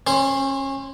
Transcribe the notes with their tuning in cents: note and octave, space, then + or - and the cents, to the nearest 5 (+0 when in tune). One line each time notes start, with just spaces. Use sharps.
C#4 -30 C5 +0